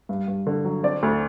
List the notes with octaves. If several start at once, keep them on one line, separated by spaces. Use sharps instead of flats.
G2
G2
D3
F#3
C4 D5
D2